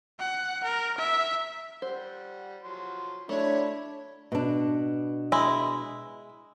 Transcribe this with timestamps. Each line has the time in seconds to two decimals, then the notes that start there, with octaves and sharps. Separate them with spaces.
0.20 F#5
0.64 A#4
0.98 E5
1.82 G3 C5 F#5
2.63 F3 F#3 C6
3.29 D3 F#3 A3 D4 E4 C#5 B5
4.32 B2 D4
5.32 G#3 E4